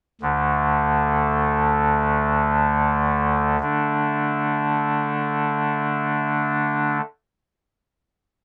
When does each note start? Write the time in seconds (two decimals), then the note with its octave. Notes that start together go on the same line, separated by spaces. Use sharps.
0.21 D2 D3 A3
3.61 D3 A3 D4